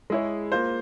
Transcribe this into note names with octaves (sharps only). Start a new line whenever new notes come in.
G#3 E4 G#4 C#5
A#3 F4 C5